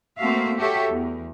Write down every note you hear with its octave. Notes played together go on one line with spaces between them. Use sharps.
A3 A#3 C4 F#4 E5 F5
F#4 G4 A4 C#5 E5
E2